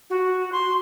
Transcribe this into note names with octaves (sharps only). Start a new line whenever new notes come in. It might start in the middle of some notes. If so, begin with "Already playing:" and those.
F#4
C6